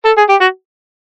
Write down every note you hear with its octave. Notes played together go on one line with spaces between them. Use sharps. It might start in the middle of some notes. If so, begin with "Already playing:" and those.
A4
G#4
G4
F#4